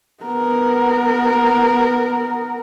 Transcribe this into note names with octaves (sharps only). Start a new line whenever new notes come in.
B3 A#4